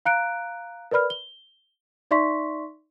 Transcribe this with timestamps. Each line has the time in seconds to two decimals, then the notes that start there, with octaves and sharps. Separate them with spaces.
0.05 F5 A#5 F#6 C#7 D7
0.91 A#4 B4 D5 B5 F6
1.10 G7
2.11 D#4 D5 E5 C6 C#6 B6